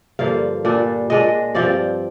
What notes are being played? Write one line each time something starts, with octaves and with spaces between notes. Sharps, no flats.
G2 D3 F3 A#3 F5
A#2 G3 D4
A#2 G#3 D4 D#5
G2 F3 C4 D5